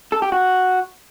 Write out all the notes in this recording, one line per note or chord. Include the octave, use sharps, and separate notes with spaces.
A4
G4
F#4